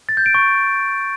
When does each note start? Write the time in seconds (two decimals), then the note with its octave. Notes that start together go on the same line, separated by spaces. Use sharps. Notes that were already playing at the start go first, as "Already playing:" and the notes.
0.09 A6
0.17 G6
0.26 D7
0.34 C#6